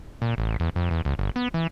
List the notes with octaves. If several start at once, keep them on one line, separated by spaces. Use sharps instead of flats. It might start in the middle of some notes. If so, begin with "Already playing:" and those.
A#2
A1
E2
F2
E2
C#2
G1
B3
E3